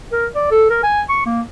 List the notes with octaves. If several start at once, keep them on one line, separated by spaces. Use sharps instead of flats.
A#4
D5
A4
A#4
G#5
C#6
A#3